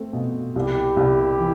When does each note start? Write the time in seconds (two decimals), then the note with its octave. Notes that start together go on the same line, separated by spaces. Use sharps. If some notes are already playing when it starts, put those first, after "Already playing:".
Already playing: A3 C4
0.13 B2
0.55 C2 E4 G4
0.97 C2
1.39 E3